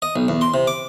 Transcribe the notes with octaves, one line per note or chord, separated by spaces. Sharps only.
D#5
B1
E2
C6
C3
D6